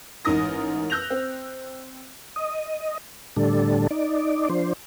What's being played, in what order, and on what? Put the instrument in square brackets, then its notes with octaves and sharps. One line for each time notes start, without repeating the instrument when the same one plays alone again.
[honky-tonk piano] A1 G#2 D#4 A#4 D#6 A#6
E6 F#6 G6 A#6 F7
C4
[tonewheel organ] D#5
A2 D3 G3 D4 A4
D#4 D5
F3 D4 C5